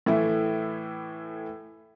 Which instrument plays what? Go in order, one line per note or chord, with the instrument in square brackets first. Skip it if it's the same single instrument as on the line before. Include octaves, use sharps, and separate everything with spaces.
[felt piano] A2 E3 A3 E4 E5